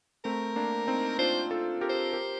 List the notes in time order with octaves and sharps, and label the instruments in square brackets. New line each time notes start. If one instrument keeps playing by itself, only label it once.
[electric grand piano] A3 C4 [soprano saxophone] A#4
[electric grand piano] A#3 D4
C4 D#4
[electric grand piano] D4 F4 [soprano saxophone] C5
[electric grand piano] F4 A4
G4 A#4
[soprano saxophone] C5
[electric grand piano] G4 A#4